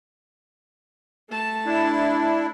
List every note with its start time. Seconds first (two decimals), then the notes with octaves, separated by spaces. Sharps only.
1.30 A3 A5
1.66 D4 E4